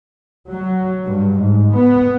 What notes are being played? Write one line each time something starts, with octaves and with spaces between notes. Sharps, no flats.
F#3
G2
G#2
B3